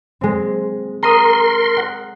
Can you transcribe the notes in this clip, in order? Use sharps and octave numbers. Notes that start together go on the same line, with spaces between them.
G#3 C4
A#4 A#5 C6 D#6
F#5